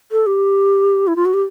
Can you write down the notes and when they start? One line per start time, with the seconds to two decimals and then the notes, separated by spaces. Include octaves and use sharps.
0.12 A4
0.26 G4
1.07 E4
1.16 F4
1.25 F#4
1.34 G4